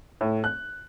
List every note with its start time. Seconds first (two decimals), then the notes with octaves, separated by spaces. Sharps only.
0.21 A2
0.44 F#6